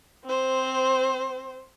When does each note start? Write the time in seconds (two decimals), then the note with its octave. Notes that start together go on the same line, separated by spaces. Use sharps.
0.25 C4 C5